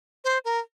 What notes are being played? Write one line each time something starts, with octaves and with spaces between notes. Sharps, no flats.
C5
A#4